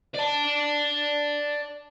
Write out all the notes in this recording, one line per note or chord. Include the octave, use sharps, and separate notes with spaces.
D5 A5